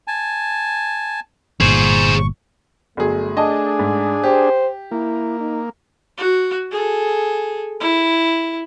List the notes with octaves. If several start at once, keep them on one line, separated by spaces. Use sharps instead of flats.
G#5 A5
G1 A#2 G#4 C5 C#6
G1 F#3 A3 G#4
D4 G#4 D#5 A5
G#2
G4 C5
A#3 E4
D#4
F#4
G#4 A4
E4